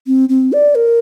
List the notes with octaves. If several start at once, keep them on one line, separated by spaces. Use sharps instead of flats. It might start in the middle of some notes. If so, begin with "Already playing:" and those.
C4
C4
D5
A#4